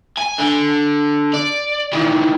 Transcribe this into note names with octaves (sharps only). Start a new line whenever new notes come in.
G#5
D3
D5
D#3 E3